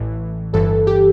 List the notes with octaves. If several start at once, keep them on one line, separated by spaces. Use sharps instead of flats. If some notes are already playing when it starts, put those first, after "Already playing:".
Already playing: A1 A2 E3
G1 G2 E3 A4
G4